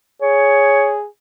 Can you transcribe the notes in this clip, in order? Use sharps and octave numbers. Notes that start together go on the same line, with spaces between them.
G#4 C#5